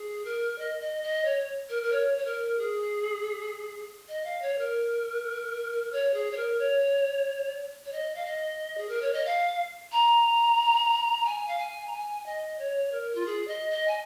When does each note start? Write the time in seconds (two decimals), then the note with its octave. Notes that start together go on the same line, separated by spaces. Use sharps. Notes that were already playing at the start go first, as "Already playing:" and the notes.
Already playing: G#4
0.25 A#4
0.58 D#5
0.81 D#5
1.02 D#5
1.25 C#5
1.69 A#4
1.82 A#4
1.92 C#5
2.17 C#5
2.25 A#4
2.58 G#4
4.08 D#5
4.24 F5
4.41 C#5
4.58 A#4
5.92 C#5
6.13 G#4
6.31 C#5
6.36 A#4
6.58 C#5
7.85 C#5
7.92 D#5
8.15 F5
8.25 D#5
8.77 G#4
8.88 A#4
9.01 C#5
9.13 D#5
9.25 F5
9.92 A#5
11.25 G#5
11.48 F5
11.58 G#5
11.87 A#5
11.92 G#5
12.26 D#5
12.58 C#5
12.92 A#4
13.15 F4
13.25 G#4
13.47 D#5
13.70 D#5
13.87 G#5